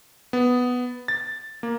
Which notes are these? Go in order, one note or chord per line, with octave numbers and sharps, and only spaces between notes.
B3
A6
A#3